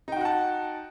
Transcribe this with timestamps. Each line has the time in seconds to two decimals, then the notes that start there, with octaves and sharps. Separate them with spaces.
0.08 D#4
0.12 G5
0.16 F#4
0.21 F#5
0.25 A5